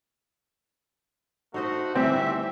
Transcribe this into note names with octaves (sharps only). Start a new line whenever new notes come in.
A3 D#4 F#4 C5 D#5
E3 G3 C4 D#4 G4 E5